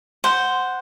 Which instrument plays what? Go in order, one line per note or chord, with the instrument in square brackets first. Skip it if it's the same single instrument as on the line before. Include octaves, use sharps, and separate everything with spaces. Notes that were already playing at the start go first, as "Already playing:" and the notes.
[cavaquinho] C5 F#5